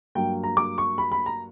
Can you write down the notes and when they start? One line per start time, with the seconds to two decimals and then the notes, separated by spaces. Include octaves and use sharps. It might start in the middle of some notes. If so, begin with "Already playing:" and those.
0.15 G2 F#3 A#3 G5
0.44 A#5
0.57 D6
0.78 C#6
0.98 B5
1.12 B5
1.26 A#5